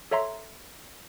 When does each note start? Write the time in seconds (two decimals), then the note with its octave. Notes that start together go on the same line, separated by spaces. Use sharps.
0.11 A4 C#5 E5 A#5 C6